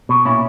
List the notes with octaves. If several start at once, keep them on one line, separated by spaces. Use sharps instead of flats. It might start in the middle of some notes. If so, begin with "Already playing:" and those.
B2
A#2 C#4 E4